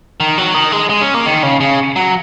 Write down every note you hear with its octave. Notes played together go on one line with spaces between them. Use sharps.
D#3
F#3
D#3
G#3
G#3
C#4
A#3
D#3
C#3
C#3
F#3